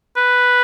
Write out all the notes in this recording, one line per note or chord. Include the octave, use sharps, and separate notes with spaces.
B4